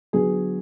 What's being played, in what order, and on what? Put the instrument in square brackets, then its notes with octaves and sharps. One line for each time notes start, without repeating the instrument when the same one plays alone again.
[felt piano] D3 F#3 B3 G#4